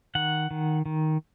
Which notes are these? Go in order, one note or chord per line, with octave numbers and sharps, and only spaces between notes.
D#3 F#5
D#3
D#3